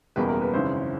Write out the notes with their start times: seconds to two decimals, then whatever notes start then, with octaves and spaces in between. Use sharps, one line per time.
0.16 F#1 E2 B2 G3 A#3 B4
0.29 A#4
0.41 B4
0.54 G#1 F#2 C#3 E3 C5